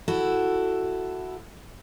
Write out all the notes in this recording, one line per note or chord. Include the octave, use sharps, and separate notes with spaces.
E4 F#4 A4